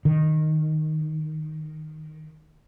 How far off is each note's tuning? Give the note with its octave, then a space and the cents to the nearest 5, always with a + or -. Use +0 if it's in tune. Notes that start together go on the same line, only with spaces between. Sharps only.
D#3 -5